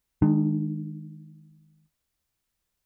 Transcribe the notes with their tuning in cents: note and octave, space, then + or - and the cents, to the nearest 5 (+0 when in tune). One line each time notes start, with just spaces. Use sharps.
D#3 +10 G#3 +5 D4 +40